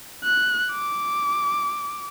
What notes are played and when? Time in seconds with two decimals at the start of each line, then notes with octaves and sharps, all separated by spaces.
0.24 F#6
0.72 D6